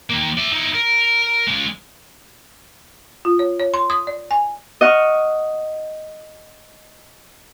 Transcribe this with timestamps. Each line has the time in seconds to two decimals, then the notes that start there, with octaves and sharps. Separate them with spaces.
0.10 D#3 A#3
0.37 D5 E5
0.52 D#4 E4
0.74 A#4
1.47 C#3 G#3
3.25 F4
3.39 C#5
3.60 C#5
3.74 C6
3.90 D#6
4.07 D5
4.31 G#5
4.81 D#5 F#5 C#6 F6